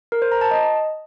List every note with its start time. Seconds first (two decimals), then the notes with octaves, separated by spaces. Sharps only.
0.12 A#4
0.22 C5
0.32 A#5
0.41 A5
0.51 D#5